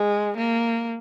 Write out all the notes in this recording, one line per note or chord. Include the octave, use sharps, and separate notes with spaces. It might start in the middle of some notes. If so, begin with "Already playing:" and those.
Already playing: G#3
A#3